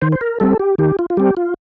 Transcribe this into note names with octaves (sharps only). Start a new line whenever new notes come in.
D#3 C5
C5
A#4
G3 C4 A4
G4
D#3 G4
F4
F4
G3 C4 G4
F4